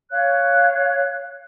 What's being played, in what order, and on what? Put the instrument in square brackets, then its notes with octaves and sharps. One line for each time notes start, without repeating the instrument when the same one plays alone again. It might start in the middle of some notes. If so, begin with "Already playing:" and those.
[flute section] C#5 F5 F#6